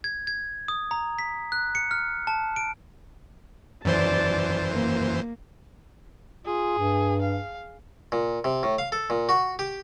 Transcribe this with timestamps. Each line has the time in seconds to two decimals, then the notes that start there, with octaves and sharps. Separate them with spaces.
0.04 G#6
0.27 G#6
0.68 D#6
0.91 A#5
1.19 B6
1.52 F#6
1.75 C#7
1.91 F6
2.27 A5
2.56 D7
3.85 F#2 E3 C5 D5 A5
4.71 A#3
6.46 F4 G#4
6.78 G2
7.21 F5
8.12 A#2
8.44 C3
8.63 A2
8.78 F5
8.92 A4
9.10 A#2
9.29 F#4
9.59 G4